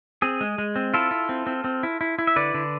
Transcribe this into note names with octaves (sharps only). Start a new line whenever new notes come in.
C4 G#4
G#3
G#3
C4
E4 F4 A4
E4
C4
C4
C4
E4
E4
E4
E5
D3 B4 D5
D3